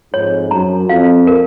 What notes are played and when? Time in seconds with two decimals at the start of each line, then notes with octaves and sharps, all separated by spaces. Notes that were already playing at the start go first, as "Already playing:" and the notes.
0.13 F2 G#2 C#5
0.51 F#2 A#5
0.89 F2 F5
1.27 A#4